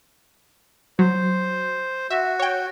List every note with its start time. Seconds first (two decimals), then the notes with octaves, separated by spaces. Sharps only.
0.99 F#3 C5
2.10 F#4 E5
2.39 C#5 G5